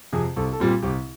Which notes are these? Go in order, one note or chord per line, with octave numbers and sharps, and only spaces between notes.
F2 C3 G#4
C2 A4
A4
A#2 G3 C4
G4
C2 G4